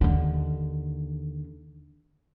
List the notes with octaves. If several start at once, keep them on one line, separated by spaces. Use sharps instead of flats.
D#2 D3